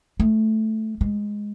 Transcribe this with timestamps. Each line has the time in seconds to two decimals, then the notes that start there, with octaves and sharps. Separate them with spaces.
0.20 A3
1.01 G#3